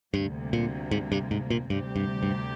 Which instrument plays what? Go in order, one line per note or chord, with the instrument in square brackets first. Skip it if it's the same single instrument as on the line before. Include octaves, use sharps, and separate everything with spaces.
[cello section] D2 C3 G3 A#3 [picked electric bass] G2
[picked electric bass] A#2
G#2
G2
G#2
A#2
[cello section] D2 C3 G3 C4 G4 [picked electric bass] G2
[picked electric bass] G2
G2